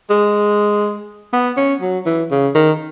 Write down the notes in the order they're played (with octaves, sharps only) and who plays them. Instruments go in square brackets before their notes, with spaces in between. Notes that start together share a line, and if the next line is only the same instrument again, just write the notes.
[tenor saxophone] G#3
B3
C#4
F#3
E3
C#3
D#3